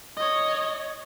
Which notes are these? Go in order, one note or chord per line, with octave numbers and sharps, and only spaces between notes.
C#5 D#5